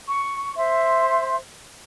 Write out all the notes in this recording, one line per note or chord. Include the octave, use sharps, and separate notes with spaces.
C#6
C5 E5 C6